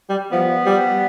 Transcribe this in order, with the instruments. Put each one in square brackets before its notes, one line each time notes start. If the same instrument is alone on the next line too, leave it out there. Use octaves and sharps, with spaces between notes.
[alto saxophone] G3
[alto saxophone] F3 [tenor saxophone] B3
[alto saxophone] G3